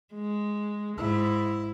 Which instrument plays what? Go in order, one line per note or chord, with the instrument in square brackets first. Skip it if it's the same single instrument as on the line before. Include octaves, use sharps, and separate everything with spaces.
[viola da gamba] G#3
[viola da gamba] G#2 [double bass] E4